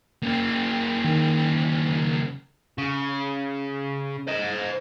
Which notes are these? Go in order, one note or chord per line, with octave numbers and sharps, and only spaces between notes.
C#3 A#3
D#3
C#3
C5 D#5